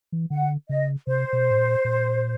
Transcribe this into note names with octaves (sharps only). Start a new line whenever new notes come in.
E3
D3 F#5
C#3 D#5
C3 C5
B2
A2
A#2
A#2